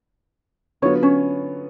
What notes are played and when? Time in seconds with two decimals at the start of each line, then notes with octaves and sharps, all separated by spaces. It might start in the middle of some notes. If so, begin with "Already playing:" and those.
0.82 D3 F#3 B3 F4 C#5
1.03 C#4 C#5